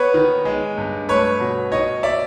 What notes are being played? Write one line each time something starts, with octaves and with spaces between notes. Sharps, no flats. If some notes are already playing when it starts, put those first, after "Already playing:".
Already playing: B3 B4 C#5
D#3
G#3
G2
A3 B4 C#5
B2
D#3 C#5 D#5
D5 E5